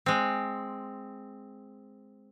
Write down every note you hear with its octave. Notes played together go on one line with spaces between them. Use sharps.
G#3 C4